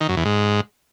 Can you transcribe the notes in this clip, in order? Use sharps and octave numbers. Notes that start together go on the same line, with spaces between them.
D#3
F#2
E2
G#2